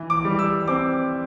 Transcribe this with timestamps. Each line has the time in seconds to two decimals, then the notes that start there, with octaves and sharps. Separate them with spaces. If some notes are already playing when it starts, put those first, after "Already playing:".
Already playing: E3
0.10 D6
0.25 G3
0.39 E6
0.68 C4 D6